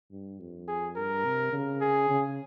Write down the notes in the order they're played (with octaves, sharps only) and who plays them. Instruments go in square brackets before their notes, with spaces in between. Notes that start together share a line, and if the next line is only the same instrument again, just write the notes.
[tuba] G2
F2
[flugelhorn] G#4
[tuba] G2 [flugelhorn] A#4
[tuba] C3
C#3
[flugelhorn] G#4
[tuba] C#3